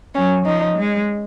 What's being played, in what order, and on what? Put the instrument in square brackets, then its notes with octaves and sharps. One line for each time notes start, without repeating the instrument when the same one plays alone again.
[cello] F#3 [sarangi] C#4
[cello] F3 [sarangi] D#4
[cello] G#3